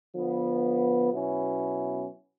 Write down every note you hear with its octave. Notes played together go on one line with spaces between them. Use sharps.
D3 F3 B3
B2 F#3 B3 C#4 E4